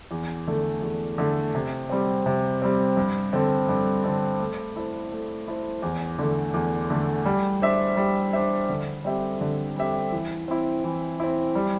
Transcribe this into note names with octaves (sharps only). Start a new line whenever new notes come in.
E2
D3 A3
E2
D3 A3
C3
G3 C4
C3
G3 C4
G2
D3 C4 A4
G2
D3 C4 A4
A3
E4 A4 C5
A3
E4 A4 C5
E2
D3 A3
E2
D3 A3
G3
D4 C5 E5
G3
D4 C5 E5
D3
G3 C4 G4 E5
D3
G3 C4 G4 E5
E3
C4 E4
E3
C4 E4
G3